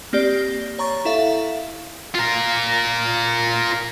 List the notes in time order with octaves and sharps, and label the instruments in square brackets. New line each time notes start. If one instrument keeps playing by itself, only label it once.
[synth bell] A#3 C4 G4 D5
C#5 A#5 C#6 A6
E4 A4 E5 F5
[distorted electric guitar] F4 A#4